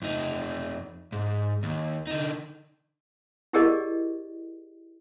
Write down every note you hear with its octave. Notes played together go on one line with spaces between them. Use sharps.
F2 D#4
G#2
D#2
D3 D#4
E4 G4 G#4 A#4 D5 D#5